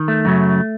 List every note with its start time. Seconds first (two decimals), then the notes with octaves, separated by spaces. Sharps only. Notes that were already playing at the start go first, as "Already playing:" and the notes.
Already playing: D#3
0.08 A3
0.25 F#2 C#3 F#3